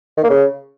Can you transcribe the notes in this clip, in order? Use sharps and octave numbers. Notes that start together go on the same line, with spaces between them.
D#3
A#3
C#3